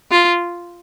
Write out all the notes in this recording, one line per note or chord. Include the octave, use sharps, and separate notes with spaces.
F4